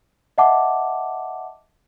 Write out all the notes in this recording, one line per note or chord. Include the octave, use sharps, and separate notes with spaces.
D#5 E5 F#5 A5 D6